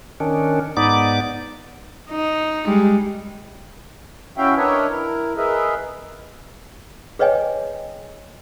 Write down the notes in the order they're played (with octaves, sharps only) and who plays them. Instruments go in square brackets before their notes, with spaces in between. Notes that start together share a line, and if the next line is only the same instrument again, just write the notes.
[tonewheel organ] D#3 C#4 D4
G#2 B3 D#4 D5 D6
[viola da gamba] D#4
G3 G#3
[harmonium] C#4 E4 F#4 E5 F5 G5
D4 A#4 B4 C#5 D#5 E5
E4 A#4
G#4 A#4 B4 D#5 E5
[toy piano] G#4 B4 C#5 D#5 G5 G#5